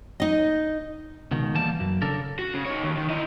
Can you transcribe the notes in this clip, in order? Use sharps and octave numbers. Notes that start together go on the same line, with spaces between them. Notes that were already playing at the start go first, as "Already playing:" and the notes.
D#4 D#5
C#2 B2 D#3
E3 G3 A#3 A5
F#2
C#3 D4 A4 A#4
F#4
C#3
D#4 C#5
D#2
D#3
E4 D#5